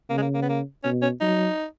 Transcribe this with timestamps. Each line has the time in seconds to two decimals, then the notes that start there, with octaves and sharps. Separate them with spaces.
0.10 C#3 A#3
0.18 G#3
0.22 A#3
0.35 A#3
0.42 B3
0.49 A#3
0.84 B2 C#4
1.02 C#4
1.21 F#3 D#4